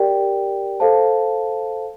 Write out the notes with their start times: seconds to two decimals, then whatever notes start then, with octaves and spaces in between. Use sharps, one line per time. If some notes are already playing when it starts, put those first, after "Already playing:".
Already playing: G4 A#4 D5 G5
0.80 A4 C5 F5 A5